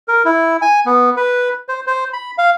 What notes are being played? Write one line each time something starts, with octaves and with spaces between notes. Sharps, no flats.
A#4
E4
G#5
B3
B4
C5
C5
B5
F5